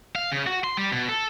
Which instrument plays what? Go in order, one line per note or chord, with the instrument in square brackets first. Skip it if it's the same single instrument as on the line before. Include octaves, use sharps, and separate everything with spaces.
[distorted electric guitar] F5
C#3
F#4
C6
G3
B2
A4